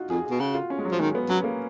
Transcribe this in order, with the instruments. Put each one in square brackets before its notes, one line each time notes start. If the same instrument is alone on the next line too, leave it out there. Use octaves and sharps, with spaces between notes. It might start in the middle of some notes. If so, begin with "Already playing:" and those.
Already playing: [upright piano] D#4 F4 F#4
[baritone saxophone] F2 [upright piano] G#4
[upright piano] G#4
[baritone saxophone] B2
[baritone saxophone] C#3 [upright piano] F#4
[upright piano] F4
C#4
G#3
F#3
[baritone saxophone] F3
[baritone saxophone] D#3 [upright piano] G#3
[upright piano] B3
[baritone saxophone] F#3 [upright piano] C#4
[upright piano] A#3